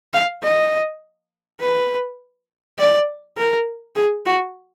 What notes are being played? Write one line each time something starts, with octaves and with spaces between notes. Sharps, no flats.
F5
D#5
B4
D5
A#4
G#4
F#4